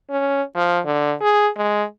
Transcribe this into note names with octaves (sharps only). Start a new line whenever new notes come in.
C#4
F3
D3
G#4
G#3